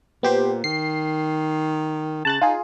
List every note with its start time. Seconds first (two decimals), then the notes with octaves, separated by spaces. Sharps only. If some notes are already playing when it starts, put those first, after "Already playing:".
0.23 A#2 B3 G4 C5
0.64 D#3 C7
2.25 C#3 A5 F#6 A6
2.42 D#4 F4 G#4